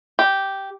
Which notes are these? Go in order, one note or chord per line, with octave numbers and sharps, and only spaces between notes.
G4